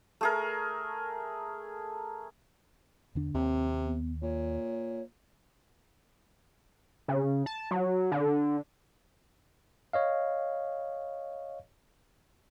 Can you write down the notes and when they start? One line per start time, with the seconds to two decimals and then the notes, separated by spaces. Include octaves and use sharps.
0.21 A3 G#4 A#4
3.15 E2 D3 D4
3.34 D#2 C3 C4
3.84 B3
4.22 A#2 C#5
7.08 C#3
7.46 A5
7.71 F#3
8.11 D3
9.93 C#5 D#5 F5